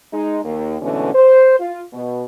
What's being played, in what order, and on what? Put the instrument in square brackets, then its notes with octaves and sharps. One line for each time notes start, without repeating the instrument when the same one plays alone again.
[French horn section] G#3 D#4
D#2
G#2 B2 D3 E3 A3 C#4
C5
F4
B2